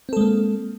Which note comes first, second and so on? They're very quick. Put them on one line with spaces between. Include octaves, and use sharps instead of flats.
C4 A4 G#3 A#3